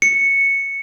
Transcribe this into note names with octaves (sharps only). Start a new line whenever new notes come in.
C#7